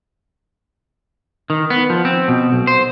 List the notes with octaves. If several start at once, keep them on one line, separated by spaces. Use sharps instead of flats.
D#3
B3
F3
C4
B2
B1
C5